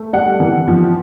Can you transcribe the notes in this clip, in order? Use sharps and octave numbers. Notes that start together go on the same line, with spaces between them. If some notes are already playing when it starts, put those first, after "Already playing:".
Already playing: A3
G3 F#5
E3
F3